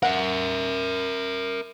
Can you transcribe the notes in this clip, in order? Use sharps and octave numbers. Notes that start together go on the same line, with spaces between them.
A#4 E5 F#5